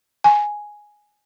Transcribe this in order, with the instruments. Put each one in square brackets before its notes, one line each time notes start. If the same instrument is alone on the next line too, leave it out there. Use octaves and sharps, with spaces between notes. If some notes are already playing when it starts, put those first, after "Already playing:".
[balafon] G#5